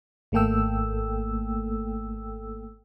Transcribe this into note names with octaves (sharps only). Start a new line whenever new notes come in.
G#1 A3 A#3 A4 G5 E6